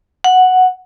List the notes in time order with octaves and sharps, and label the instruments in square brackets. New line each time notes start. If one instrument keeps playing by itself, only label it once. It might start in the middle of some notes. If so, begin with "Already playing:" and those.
[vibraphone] F#5